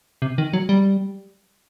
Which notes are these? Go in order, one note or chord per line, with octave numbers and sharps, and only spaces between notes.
C3
D#3
F#3
G3